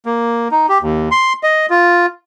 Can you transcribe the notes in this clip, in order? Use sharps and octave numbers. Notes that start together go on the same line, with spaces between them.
A#3
D#4
G4
D#2
C6
D#5
F4